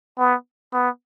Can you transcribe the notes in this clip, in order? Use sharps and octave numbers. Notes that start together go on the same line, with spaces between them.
B3
B3